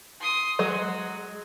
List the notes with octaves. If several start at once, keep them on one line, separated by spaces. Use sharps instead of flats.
C6 D#6
F#3 G#3 F#4